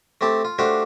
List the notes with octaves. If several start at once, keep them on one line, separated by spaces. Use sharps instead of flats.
A3 C4 G4 A5
F4
A3 D4 F#4 G4 C5 F5